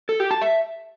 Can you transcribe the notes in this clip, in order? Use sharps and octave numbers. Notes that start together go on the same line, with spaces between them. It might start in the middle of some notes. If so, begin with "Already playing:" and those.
A4
G4
A5
E5